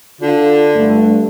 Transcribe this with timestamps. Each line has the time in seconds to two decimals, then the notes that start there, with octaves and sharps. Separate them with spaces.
0.21 D3 F4
0.75 G2 A3